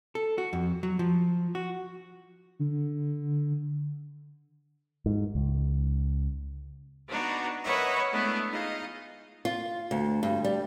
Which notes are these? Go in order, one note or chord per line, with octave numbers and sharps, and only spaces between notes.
A4
F#4
F2
F#3
F3
F#4
D3
G#2
C#2
B3 D4 D#4 F#4
A#4 B4 C#5 D#5 E5 F#5
G#3 A3 B3 D4 E4
D#4 F4 G#4 D#5 F5
F4
D2
G2
G3